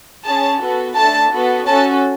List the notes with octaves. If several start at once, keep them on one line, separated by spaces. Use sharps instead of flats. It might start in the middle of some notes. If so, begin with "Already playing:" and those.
C#4 G#4 A5
B3 F#4 A4
A3 D4 A4 A5
B3 F#4 A4
C#4 F#4 A4 A5